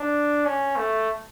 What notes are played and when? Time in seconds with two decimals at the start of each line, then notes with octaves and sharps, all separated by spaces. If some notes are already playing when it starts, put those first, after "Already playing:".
Already playing: D4
0.45 C#4
0.76 A3